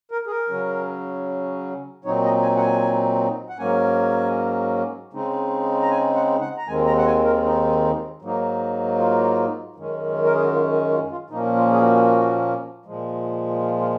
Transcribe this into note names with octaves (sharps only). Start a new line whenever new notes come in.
A#4
G#4
A#4
C#3 F#3 C#4
A#2 F#3 C4 D#4 C#5
D#5
G#5
F#5
G#5
F#5
G#2 F#3 A#3 C#4 G#5
C#3 G#3 C4 D#4
A#5
G#5
F#5
F#5
A#5
D#2 D#3 G#3 C4 G#5
A#5
F#5
G#5
A#4
D#4
G#2 F#3 A#3 D#4
F4
F#2 D#3 G#3 C#4
A#4
G#4
F#4
F4
F#4
F4
F4
A#2 F3 A#3 C#4 D#4
F4
G#4
F#4
A#2 F3 G#3
F4
F4